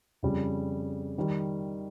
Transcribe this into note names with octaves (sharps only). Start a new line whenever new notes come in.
F2 C#3 G3
D#3 G3